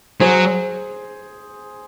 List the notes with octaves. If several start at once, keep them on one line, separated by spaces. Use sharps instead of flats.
F#3 G#4 C5